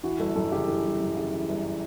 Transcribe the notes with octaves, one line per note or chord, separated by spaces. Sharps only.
E3 F#4
G1 A4
F#2 A4
C#3 G4
E3 A4
G1
F#2
C#3
E3
G1